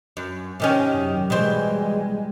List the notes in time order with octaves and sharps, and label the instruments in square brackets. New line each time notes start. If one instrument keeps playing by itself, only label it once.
[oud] F#2
C3 D#3 C#4
[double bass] F#2
[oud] B2 E3 C5 [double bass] G3 G#3